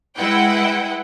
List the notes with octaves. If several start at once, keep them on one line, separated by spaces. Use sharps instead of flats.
G#3 E4 B4 F#5 G5